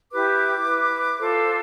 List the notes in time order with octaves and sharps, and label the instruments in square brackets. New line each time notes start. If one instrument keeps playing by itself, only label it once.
[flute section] E4 G4 B4 D6
E4 B4
F4 A4 C5